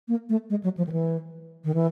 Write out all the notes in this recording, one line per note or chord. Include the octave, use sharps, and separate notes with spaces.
A#3
A3
G#3
F#3
F3
D#3
E3
D#3
E3